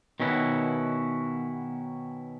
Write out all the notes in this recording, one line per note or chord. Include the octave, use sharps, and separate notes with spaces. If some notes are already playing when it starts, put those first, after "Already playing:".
B2 D#3 C#4 E4 F#4